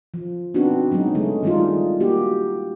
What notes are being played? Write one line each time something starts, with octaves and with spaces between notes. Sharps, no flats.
F3
B3 C4 D4 D#4 F#4
F#3 G#3 B3 D#4
C#3 G#3 A3
D#3 G3 G#3 D#4 F4
A#3 F#4 G4